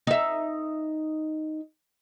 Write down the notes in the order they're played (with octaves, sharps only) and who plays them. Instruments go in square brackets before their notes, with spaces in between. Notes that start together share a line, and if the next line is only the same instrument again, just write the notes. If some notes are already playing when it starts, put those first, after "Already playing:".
[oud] D#4 E5